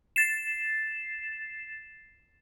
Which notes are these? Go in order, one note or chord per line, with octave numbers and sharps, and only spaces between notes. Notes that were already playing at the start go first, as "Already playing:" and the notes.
A6 C7 E7